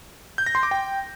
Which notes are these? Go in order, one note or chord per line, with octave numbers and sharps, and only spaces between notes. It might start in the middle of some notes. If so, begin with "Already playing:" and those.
G6
A#6
C6
D6
G5